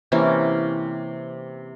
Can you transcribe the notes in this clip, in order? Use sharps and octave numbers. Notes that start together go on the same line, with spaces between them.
C3 E3 A#3 C#4